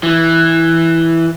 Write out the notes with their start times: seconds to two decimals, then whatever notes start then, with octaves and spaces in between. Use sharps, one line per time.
0.03 E3